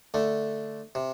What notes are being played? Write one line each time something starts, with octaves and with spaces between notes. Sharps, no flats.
D3 A3
C3